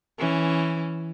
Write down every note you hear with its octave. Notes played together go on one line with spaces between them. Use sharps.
E3 C#4